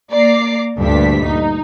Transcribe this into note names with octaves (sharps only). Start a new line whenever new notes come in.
A#3 D5 A#5 D6 C7
D2 G2 A#2 G3 D4 B6
D#4